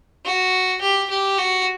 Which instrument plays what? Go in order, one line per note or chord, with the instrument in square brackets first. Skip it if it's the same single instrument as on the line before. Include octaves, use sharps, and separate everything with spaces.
[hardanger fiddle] F#4
G4
G4
F#4